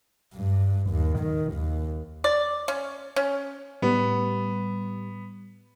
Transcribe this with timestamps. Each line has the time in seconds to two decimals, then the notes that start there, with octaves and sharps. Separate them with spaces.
0.35 G2
0.90 D#2
1.19 D#3
1.53 D#2
2.24 D5
2.68 C#4
3.16 C#4
3.82 A2 G3 B3